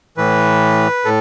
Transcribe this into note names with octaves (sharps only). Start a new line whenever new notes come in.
A2 E3 B4
A2 A4